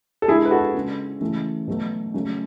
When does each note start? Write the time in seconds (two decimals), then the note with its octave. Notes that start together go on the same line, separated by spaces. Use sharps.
0.22 A4
0.28 D3 G#3 E4 G#4
0.45 B4
0.51 F#4 A4
0.74 C#3 G#3
1.20 C#3 E3 A3
1.68 B2 F#3 A3
2.14 C#3 F#3 A3